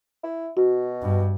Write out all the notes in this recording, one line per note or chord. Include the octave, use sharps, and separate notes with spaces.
E4
B2 F#4
G2